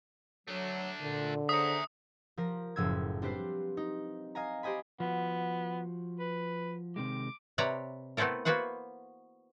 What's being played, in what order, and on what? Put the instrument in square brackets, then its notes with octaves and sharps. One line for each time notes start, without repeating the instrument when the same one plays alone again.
[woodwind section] F#3 [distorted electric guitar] A3 D4
[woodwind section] A#2 [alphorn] D3
[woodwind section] C#3 C5 A#5 [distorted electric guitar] E5 F#5 [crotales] D#6
[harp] F3 A#4 A#6
F#1 A2 F3 E6 G#6
G3 C4 D4 B4 C5
D#4
D#5 F5 G#5 A#5
G4 C5 D#5 G#5 B5
[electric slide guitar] F3 F#4 [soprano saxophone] B3
[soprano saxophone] B4
[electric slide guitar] C3 D#3 G#3 [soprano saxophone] D6
[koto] C3 B4 C#5 D5 A#5
A3 B3 C4 E4 A4 A#4
A#3 B3 F#4 B4 C5 F#5